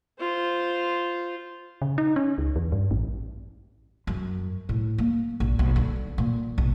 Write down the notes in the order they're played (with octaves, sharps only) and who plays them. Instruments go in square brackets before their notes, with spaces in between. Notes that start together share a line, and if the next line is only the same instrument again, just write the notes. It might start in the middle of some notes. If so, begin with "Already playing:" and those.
[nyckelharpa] F4 C5
[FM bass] C#3
D#4
C#4
C#2
E2
G2
A1
[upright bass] F#2
A2
A#3
A#1
B1
D3
A#2
B1